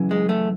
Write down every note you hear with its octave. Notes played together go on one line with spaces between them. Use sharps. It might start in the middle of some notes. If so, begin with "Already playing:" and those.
Already playing: F#2 C#3 E3
G#3
A3